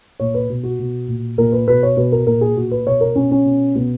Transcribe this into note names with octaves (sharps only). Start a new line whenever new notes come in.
A#2 C#5
B4
B2
F#4
B2
A#2
A#2 A#4
B4
B2 B4
C#5
B2 B4
A#4
A#2 A#4
G#4
A#2 F#4
B4
B2 C#5
A#4
B2 C#4
C#4
B2
B2 B3